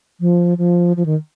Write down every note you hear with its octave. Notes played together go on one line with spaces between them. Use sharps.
F3
F3
F3
D#3